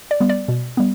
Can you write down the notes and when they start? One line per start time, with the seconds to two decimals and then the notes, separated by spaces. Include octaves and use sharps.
0.11 D5
0.20 G3 B3
0.29 D5
0.48 B2
0.77 G3 B3